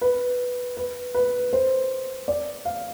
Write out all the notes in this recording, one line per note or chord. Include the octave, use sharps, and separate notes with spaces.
B4
B4
B4
C5
D5
F5